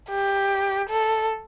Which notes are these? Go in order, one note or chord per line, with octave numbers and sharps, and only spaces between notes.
G4
A4